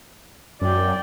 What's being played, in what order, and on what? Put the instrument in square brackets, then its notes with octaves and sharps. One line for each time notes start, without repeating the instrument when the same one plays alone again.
[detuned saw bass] F#2 [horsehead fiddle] D5 G5